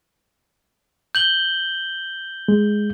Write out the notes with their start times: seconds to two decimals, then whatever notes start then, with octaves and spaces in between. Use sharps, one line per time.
1.15 G6 F#7 G7
2.48 G#3